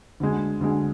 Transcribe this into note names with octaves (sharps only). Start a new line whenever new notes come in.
D2 D3 G#3
D2 D3 G#3